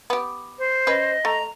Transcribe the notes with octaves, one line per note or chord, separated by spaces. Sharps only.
B3 G4
C5
C#4 B4 D#5
A3 A#5